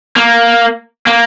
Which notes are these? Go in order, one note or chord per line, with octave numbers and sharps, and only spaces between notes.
A#3
A#3